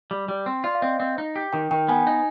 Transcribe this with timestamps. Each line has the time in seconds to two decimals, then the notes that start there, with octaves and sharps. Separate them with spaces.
0.11 G3
0.28 G3
0.46 C4
0.64 F4 D5
0.75 F5
0.81 C4 D#5
1.00 C4
1.18 D#4
1.36 G4
1.53 D#3 G5
1.71 D#3 G5
1.88 B3 G#5
2.07 D#4